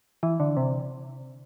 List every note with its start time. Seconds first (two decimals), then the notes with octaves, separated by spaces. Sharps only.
0.23 E3
0.40 D3
0.57 C3